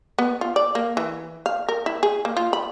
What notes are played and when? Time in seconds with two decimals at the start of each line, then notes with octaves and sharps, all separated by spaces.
0.19 B3
0.41 F4
0.56 D5
0.75 A#3
0.97 E3
1.46 F5
1.69 A#4
1.86 E4
2.03 G#4
2.25 A#3
2.37 F4
2.53 B5